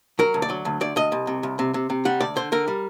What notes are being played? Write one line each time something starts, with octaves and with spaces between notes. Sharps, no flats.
F#3 A#4
D2
D5
F#3
D2
D2 D5
D2 D#5
C2
C3
C2
C3
C3
C3
G3 F#5
D2 D5
D3 C5
D3 A#4
G3